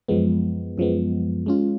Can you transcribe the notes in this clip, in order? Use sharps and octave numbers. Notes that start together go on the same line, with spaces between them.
F#2 F3 G#3 B3
F#2 F3 G#3 B3
G#3 C#4 F4